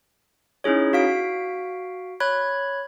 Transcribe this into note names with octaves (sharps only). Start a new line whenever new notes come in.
C#4 D#4 E4 G#4 C#5
F#4 F5 B6 D7
C#5 B5 F#6 G#6